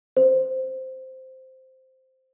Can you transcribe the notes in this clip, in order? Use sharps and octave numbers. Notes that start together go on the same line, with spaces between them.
C5